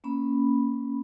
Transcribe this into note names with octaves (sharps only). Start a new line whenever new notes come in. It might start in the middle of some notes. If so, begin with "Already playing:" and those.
A#3 C#4 B5